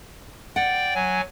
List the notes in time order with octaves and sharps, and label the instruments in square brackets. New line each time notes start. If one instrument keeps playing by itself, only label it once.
[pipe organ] D5 G5 [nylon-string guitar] F#5
[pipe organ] F#3 G#5